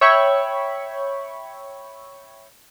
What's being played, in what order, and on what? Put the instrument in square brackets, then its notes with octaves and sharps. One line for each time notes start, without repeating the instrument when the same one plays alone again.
[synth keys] C#5 E5 G5 B5 C#6